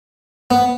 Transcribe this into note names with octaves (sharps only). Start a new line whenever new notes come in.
B3